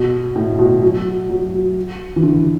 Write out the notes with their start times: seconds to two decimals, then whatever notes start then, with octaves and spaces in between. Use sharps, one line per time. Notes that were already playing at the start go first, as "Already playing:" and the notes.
Already playing: B2
0.35 A2
0.59 B2
0.82 F#3
1.30 F#3
1.53 F#3
2.16 E3
2.23 D3